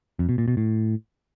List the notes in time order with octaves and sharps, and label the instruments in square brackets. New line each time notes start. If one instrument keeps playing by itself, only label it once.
[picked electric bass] F2
B2
A#2
B2
A2